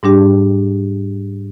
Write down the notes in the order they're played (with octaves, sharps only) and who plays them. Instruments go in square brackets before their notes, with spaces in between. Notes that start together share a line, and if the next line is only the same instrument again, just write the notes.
[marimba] G#2 G3 D4 G4